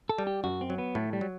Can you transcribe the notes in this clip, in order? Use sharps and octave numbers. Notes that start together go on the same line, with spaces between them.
A4
G3
G4
F#2 F#4
C4
F#3
B3
A2 A3
G3
F#3